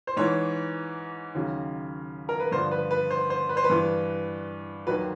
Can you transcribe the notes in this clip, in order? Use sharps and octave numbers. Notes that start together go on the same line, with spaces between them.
C5
G#2 E3 C#5
D#2 C#3 F#3
A#4
B4
G2 D3 F3 C5
B4
B4
C5
C5
B4
C5
B4
G2 E3
D#2 D#3 F#3 B4